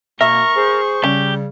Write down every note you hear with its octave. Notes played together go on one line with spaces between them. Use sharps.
B2 A#3 A#4 E5 C#6
G#4 C5
C#3 G3 C#4 G4